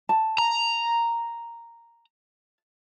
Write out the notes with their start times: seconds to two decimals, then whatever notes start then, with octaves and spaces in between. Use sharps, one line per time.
0.09 A5
0.38 A#5